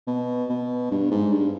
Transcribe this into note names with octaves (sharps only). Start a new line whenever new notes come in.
B2
B2
G2
G#2
G2